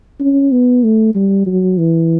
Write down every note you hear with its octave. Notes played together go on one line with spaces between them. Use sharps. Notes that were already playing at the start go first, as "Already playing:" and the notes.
C#4
B3
A3
G3
F#3
E3